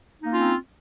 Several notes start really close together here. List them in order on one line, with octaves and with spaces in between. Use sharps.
D#4 A#3 C#4 F4 C4